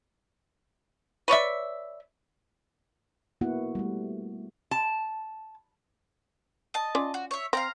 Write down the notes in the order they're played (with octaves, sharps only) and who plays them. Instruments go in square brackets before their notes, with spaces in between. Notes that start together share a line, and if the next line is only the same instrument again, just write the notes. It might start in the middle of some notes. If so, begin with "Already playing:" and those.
[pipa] B4 C#5 D5 E5
[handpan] A#3 B3 E4 F#4 F#5
G3 A3
[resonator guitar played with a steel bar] A5
[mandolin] D#5 A5
[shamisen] C#4 F4 D5
[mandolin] F#4
C#5 E5
[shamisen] C4 [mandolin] F5 F#5 A#5